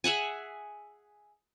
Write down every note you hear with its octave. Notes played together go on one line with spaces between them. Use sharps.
G#4 E5 F#5 G#5